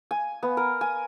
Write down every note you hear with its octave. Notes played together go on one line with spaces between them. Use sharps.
G#5
B3
A#4
G#5